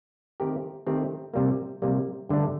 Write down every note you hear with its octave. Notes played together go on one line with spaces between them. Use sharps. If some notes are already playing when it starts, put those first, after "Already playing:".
D#3 A3 C4 G4 A#4
D#3 A3 C4 G4 A#4
C3 G3 A#3
C3 G3 A#3
G2 D3 A3 D4